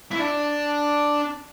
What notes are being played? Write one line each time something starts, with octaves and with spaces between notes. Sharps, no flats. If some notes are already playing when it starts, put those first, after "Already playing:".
E4
D4